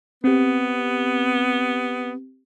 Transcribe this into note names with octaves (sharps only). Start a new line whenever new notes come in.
B3 C4 G4